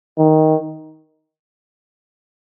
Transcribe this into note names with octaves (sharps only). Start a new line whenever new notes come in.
D#3